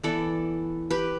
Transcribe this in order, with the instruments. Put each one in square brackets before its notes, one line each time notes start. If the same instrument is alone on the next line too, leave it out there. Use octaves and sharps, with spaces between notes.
[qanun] E3 B3 A4 D5
G4 B4